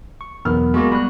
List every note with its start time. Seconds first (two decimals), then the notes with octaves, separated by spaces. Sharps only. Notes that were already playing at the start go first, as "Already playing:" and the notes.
0.21 C#6
0.45 B1 E2 B3 A#4 F6
0.74 G#3 A#3 F#4
0.92 G3 B5 F#6